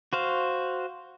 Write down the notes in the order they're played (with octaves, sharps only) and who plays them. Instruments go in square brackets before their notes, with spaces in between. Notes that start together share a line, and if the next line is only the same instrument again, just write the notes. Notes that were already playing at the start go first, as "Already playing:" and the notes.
[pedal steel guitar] F#4 C5 F5